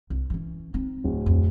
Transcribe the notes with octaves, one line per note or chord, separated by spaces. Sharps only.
C2
E3 C#4
C4 D#4
D1
F2